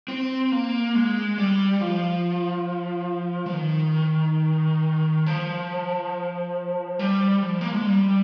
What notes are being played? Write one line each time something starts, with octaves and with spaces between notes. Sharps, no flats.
C4
A#3
G#3
G3
F3
F3
D#3
F3
G3
F3
A#3
G#3
G3